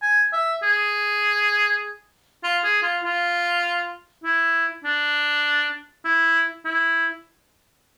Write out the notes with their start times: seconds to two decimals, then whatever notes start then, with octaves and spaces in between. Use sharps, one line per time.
0.02 G#5
0.33 E5
0.63 G#4
2.44 F4
2.64 G#4
2.83 F4
3.04 F4
4.24 E4
4.84 D4
6.05 E4
6.65 E4